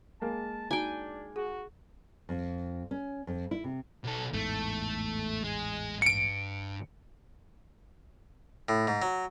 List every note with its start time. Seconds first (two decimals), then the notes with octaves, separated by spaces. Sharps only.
0.21 G#3 A#3 A#4 A5
0.71 D4 D#4 F#4 G5 G#5 A#5
1.36 F#4 G#4
2.29 F2
2.91 C#4
3.27 F2
3.51 E4
3.64 C3
4.04 B1 A4
4.34 A1 E2 G#2 A3
5.44 G#3
6.02 G2 C#7 D7
8.69 A2
8.87 G#2
9.02 F#3